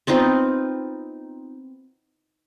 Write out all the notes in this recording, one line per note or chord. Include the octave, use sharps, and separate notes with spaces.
B3 C4 D#4 F4